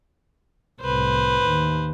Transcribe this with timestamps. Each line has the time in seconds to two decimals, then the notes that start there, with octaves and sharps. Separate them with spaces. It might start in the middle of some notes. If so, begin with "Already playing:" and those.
0.81 C2 A2 B4 C5
1.45 D#2